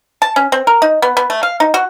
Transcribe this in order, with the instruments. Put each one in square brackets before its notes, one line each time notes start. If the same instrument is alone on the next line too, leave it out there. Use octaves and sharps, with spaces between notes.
[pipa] A5
C#4
C4
A#4
D#4
B3
B3
A3
F5
D#4
F#4